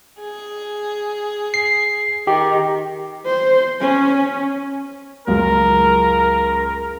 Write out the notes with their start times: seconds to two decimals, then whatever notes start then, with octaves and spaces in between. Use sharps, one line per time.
0.21 G#4
1.54 C7
2.27 D#3 G4
3.26 C5
3.80 C#4
5.27 C#2 F#2 A#4